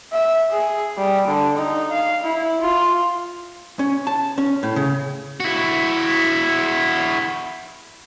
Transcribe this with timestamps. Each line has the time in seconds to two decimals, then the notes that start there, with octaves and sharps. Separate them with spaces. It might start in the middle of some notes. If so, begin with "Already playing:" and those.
0.12 E5
0.52 G#4
0.97 G3
1.28 D3
1.57 D#4
1.91 F5
2.23 E4
2.61 F4
3.79 C#4
4.07 A5
4.38 C#4
4.63 A2
4.76 C#3
5.40 E4 F#4